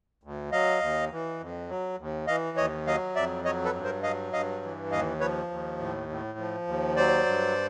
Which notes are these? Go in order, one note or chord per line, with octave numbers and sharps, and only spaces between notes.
D2
F#3 D#5 F5
D#2
E3
F2
F#3
D#2
E3 D#5 F5
D#2 C#5 D#5
F#3 D#5 F5
F2 D5 E5
F#3 C#5 D#5
A4 B4
G2
A#4 C5
F#3 D#5 F5
G2 D#5 F5
E3
D#2 D#5 F5
F3 B4 C#5
D#2
A2
A2
F3
D#2
F#3 C5 D5
G2